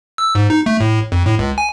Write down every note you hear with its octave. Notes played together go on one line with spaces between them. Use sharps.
E6
G#2
D#4
A3
A2
F2
A2
C#2
G#5